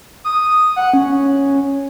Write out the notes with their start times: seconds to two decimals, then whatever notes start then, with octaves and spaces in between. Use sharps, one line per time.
0.24 D#6
0.76 F#5
0.93 C#4